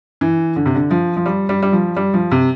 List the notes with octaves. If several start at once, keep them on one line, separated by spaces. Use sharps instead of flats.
E3
D3
C3
D3
F3
F3
G3
G3
G3
F3
G3
F3
C3